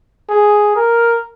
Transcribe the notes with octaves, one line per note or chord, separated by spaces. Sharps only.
G#4
A#4